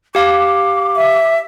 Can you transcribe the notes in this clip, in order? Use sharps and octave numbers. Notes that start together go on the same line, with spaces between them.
G4 F5 D6
E5